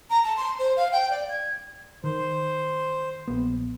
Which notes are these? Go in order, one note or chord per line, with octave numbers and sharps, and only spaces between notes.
A#5
A5
C6
C5
F5
G5
D5
G#6
D#3 C5
A#1 B3